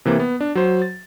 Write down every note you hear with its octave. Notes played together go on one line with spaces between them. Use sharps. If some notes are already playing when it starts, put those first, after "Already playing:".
C3 E3 A#3
B3
D4
F#3 C5
A6